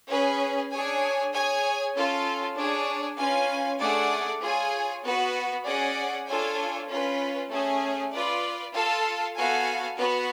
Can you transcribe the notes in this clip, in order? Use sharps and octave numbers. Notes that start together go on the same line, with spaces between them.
C#4 G#4 B4
D4 G#4 C#5 G#5
G#4 C#5 G#5
C#4 F4 A4
D4 G#4 C#5
C#4 F4 B4 F5 G#5
A3 D4 G#4 D5 F#5
F4 G#4 C#5 G#5
B3 F#4 B4
C#4 G#4 D5 F#5
D4 F4 A4 C#5 G#5
C#4 F4 B4
A3 C#4 G#4
F4 B4 D5
F4 A4 F5 A5
B3 F#4 A4 F5 G#5
B3 F#4 B4